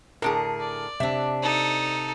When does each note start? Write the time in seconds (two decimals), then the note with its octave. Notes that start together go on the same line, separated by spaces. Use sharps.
0.22 A2 D3 G#4 A#4
0.60 D5
1.00 C3 D4 E5
1.42 D#4 A4